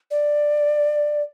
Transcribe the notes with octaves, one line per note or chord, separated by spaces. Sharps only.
D5